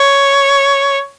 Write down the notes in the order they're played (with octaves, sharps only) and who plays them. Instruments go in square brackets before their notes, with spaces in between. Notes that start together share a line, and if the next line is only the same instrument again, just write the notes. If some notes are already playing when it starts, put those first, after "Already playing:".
Already playing: [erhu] C#5